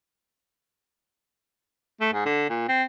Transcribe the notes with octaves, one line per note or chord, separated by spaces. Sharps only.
A3
G#2
D3
A#2
C4